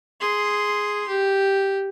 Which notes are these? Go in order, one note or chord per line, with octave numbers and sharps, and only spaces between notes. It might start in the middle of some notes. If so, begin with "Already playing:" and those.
G#4 C6
G4